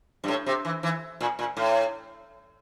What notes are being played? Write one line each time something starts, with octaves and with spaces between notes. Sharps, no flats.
G2
A2
C3
E3
E3
A#2
A#2
A2